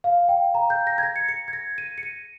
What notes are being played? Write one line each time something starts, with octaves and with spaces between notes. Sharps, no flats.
F5
G5
A#5
G6
A#6
G#6
A#6
C#7
C#7
G#6
A#6
D#7
C#7
D#7